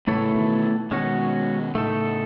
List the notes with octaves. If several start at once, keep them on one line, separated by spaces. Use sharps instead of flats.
A2 C#3 E3 A3 E4 A4 C#5
B2 D#3
B2 D#3 G#3 C#4 F#4 C#5
A2 C#3 A3 D#4 A4